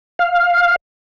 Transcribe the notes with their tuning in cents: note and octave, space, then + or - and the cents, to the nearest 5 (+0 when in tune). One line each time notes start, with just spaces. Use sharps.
F5 +5